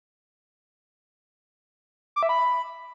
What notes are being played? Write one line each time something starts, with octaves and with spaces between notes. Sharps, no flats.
D6
E5
B5